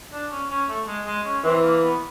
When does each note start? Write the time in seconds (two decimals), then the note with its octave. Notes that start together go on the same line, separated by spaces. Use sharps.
0.13 D4
0.31 C#4
0.50 C#4
0.69 A3
0.87 G#3
1.07 G#3
1.25 C#4
1.44 E3 C4
1.64 A#3
1.82 B3